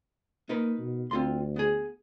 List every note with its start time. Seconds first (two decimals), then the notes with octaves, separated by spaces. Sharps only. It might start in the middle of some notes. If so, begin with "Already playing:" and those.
0.49 A#3 D#4 A#4 B4
0.79 B2
1.11 D2 C4 F4 C6
1.56 B3 G#4